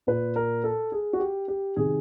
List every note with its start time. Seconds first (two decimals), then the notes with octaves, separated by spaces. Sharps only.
0.07 A#2 B4
0.36 A#4
0.64 A4
0.92 G#4
1.13 F#4
1.20 G4
1.48 G4
1.76 C3 D#3 G#4